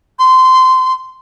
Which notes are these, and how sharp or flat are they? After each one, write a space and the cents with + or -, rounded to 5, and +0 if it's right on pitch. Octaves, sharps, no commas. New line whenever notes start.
C6 -20